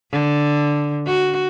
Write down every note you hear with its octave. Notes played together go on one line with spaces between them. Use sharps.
D3
F#4